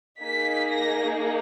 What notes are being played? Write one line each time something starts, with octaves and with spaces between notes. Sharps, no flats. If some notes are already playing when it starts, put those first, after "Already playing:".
A#3 D#4 G#4 B6
A#6